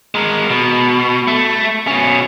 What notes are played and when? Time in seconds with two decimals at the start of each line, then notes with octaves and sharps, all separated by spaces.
0.15 G#3 A#4
0.50 B2
1.28 A3
1.87 B2 C#4